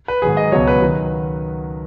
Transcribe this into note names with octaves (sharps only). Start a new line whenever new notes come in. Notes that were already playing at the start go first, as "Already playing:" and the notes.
B4
G#2 D#3 F#3 G#4
D#5
C#2 B2 F#3 C#5
B4
D#3 F#3